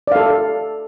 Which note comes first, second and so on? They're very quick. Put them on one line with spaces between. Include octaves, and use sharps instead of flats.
D5 F5 A4